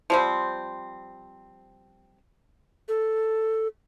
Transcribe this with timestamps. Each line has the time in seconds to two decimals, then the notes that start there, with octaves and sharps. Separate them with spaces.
0.10 F3 G3 C4
2.88 A4